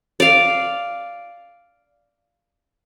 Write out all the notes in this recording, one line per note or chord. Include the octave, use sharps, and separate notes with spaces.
D5 F5